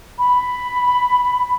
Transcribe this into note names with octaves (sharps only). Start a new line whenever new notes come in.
B5